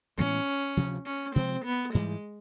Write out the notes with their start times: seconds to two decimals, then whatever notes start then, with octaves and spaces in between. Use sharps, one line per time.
0.18 A2 E3 G#3 B3 C#4
0.77 D2 C3 F3
1.06 C#4
1.35 C3 F3 G#3 C4
1.65 B3
1.93 G#2 E3 G3 G#3